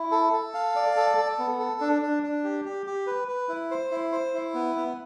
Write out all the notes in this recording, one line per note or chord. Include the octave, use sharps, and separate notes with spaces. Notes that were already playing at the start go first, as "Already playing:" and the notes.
Already playing: E4
A4
A4
F5
D5
A4
A4
B3
A4
D4
D4
D4
G4
G4
G4
B4
B4
E4
C5
E4
C5
E4
B3
B3